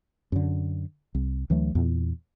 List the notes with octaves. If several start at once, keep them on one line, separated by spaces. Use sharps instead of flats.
F#2 D3
C2
D2 E3 F#3 A3
E2 A#2